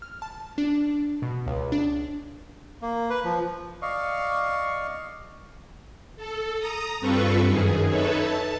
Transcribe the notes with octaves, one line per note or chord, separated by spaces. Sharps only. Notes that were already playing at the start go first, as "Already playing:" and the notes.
F6
A5
D4
B2
C#2
D4
A#3
B4
F3
D5 D#5 F5 C#6
A4
A#5 D#6
G2 C4 F4 A4 B4 C#6
F#2 D#3 G#4
D#4 A4 B4 C#5 E5
A5